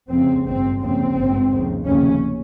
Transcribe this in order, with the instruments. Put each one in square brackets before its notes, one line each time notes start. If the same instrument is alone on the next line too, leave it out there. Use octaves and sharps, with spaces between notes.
[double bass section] F1 F2 C#3 C4
G#1 G2 C4
F1 D#2 C#3 C4
G#1 G2
F1 D#2 C#3
F1 D#2 C#3 C#4